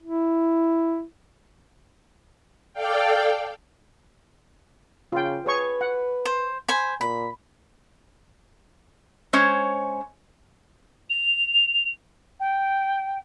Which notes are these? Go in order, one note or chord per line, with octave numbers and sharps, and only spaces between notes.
E4
A4 D5 F5 G5
C#3 F4 G5
G#4 B4 C#5 C#6
F#5
C5
C5 G#5 B5
A#2 B5
G#3 C#4 C5 C#5
F7
G5